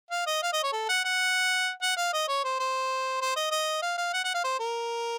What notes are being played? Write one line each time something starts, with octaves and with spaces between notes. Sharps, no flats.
F5
D#5
F5
D#5
C#5
A4
F#5
F#5
F#5
F5
D#5
C#5
C5
C5
C5
D#5
D#5
F5
F5
F#5
F#5
F5
C5
A#4